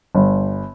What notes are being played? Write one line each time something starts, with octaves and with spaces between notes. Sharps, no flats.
G1